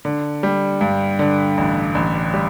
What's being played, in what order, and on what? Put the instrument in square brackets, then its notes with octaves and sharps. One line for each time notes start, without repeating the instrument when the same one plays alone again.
[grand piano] D3
G3
G2
D3
A1
A1
G3